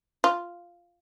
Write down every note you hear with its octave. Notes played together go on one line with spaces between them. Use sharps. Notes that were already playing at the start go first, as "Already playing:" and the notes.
F4